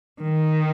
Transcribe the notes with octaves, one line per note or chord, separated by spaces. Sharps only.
D#3